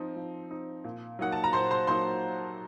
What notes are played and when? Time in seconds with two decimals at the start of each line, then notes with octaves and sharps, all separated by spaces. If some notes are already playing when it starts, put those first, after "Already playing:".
Already playing: F3 C4 D#4
0.16 F3
0.50 C4 D#4
0.84 A#2
1.19 F#3 A#3 D#4 F#5
1.32 A5
1.44 A#5
1.53 A#2 C5 C6
1.71 C5 C6
1.87 F#3 A#3 D#4 C5 C6